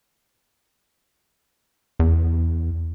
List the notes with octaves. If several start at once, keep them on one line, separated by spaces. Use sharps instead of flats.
E2